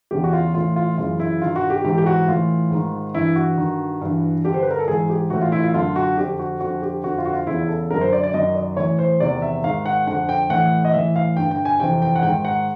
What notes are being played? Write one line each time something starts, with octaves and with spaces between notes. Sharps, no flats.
E2 C#3 E3 G4
F#4
F4
A2 E3 F4
F4
F#2 C#3 E3 F4
E4
G2 D#3 F4
F#4
G4
G#2 E3 G4
G4
F#4
A2 E3 F4
G#2 D#3
G2 E3 E4
F#4
G2 D#3
G2 E3
G2 D3 G4
C5
B4
A#4
A4
G#2 E3 G#4
G4
A2 E3 F#4
F4
E4
F4
F#2 D3 F4
F#4
F2 D3 G4
F#4
F2 D3 F#4
G4
F2 D3 F#4
F4
F#4
F4
E2 C#3 E3 E4
A4
F#2 D3 A#4
C5
D5
D5
F#2 D#3 D#5
D5
A2 E3 C#5
C5
E2 C3 D#3 D5
E5
G#2 D#3 F5
F#5
F2 D3 F#5
G5
A2 E3 F#5
D#5
A2 E3 E5
F5
G2 D3 G5
G5
G#5
F2 C3 E3 G5
G5
F#5
G#2 D#3 G5
F#5